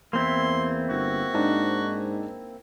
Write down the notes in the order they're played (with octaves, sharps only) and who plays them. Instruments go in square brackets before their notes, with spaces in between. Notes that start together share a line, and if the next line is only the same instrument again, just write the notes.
[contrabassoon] E2 [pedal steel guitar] A#3 C4 E4 [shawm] C6
[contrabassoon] G1 [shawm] F#4
[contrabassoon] G#2 [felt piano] D4 D#4